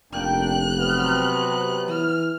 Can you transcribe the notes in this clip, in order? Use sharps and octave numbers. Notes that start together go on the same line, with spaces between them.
F1 A#3 D4 G5 F#6
C3 F#3 B3
E3 F6